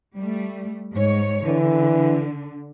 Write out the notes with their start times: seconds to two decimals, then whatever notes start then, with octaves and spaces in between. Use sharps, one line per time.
0.17 G3 A3
0.94 G#2 C#5
1.45 D3 E3